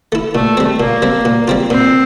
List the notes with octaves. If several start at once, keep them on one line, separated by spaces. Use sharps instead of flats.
A3 E4
A#2 A3
G3 C4
A#2 A#3
G3 C4
A#2
G3 C4 F4
A#2 C4